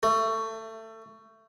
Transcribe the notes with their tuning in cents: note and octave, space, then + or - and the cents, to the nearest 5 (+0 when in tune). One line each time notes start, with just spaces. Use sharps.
A3 +20